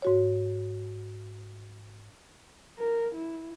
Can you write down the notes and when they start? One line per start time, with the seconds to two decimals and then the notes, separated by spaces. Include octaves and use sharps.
0.02 G#2 F#4 C#5
2.79 A#4
3.15 E4